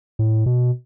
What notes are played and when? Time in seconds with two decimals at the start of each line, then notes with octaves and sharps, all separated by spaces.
0.19 A2
0.46 B2